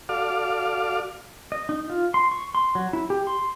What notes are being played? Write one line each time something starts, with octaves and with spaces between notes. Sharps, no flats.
F#4 A4 D5 F5 D6 F6
D#5
D#4
F4
C6
C#6
C6
F#3
E4
G4
C6